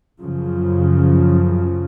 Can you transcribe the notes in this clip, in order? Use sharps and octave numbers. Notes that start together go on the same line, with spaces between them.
F#2 C#3 F3